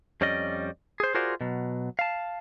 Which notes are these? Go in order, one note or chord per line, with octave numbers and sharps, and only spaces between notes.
F2 G3 C#4 D5 D#5
G#4 C5
F4 F#4 G#4 A#4 C5 D5
B2 F#3
F5 A5